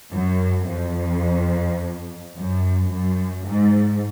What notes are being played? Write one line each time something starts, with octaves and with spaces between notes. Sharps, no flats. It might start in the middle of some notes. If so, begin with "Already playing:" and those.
F#2
F2
F#2
F#2
G#2